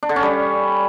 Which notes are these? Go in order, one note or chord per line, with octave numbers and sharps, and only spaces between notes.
D4
D3
C#4
G3